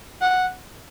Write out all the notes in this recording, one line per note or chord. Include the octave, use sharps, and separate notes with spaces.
F#5